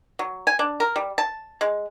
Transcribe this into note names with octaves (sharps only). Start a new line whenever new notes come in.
F#3
G#5
D4
A#4
G3
A5
G#3